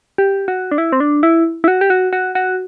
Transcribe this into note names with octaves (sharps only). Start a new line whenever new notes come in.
G4
F#4
D4
E4
C4
D4
E4
E4
F#4
G4
F#4
F#4
F#4